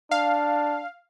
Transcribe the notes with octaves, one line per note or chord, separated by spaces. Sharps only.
D4 F5